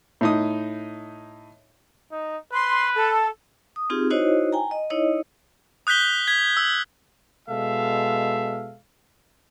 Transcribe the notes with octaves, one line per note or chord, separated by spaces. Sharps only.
A2 D#4 D#6
D#4
B4 C6
A4
D#6
C4 D#4 F4 G4 G#4
D#4 E4 F#4 C5 C#5 D#5
G5 G#5 A#5
D#5
D#4 E4 C#5 D#5
D#6 F#6 G6 B6 G7
G#6 B6
E6
B2 G#3 A4 E5 F5